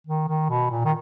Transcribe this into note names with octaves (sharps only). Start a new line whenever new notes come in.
D#3
D#3
B2
A#2
D#3